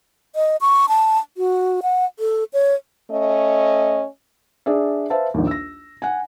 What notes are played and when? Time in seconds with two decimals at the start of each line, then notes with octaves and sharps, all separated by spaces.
0.36 D#5
0.61 C#6
0.89 A5
1.37 F#4
1.83 F#5
2.19 A4
2.53 C#5
3.11 A3 C#4 D#5
4.66 D4 G#4 D5 E5
5.10 B4 C5 E5 F5 A5
5.34 A#1 D#2
5.47 E6 A#6
6.02 F#5 G#5